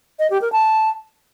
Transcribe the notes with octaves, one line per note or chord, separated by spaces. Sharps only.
D#5
G4
A#4
A5